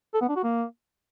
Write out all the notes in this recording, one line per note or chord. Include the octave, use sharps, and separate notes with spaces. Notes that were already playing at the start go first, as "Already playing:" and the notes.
A4
B3
D4
F#4
A#3